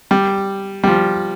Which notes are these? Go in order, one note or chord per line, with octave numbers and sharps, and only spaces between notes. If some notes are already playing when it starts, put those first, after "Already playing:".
G3
G3
F3